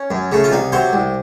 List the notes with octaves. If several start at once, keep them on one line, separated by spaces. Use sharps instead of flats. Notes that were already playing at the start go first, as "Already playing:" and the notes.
Already playing: C#4
F#2
C#3 A3
F4
C2 D#4
C3 F#3 C5
C2